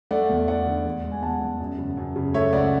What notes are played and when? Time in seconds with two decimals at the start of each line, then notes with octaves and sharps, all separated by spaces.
0.11 A3 D5 F#5
0.30 E2
0.48 E2 D5 F#5
0.67 D3
0.85 E2
1.04 G#3
1.12 G#5
1.22 E2 F#5 A5
1.41 E2
1.60 F#2
1.78 C#3
1.97 F#2
2.16 C#3
2.34 A3 C#5 E5
2.53 C#2 D5 F#5